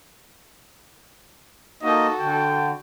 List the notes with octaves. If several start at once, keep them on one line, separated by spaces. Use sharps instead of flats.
A#3 D#4 F#4 A4 D#5
D3 G5